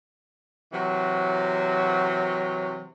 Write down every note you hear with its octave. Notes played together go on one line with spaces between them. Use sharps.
C3 E3 F#3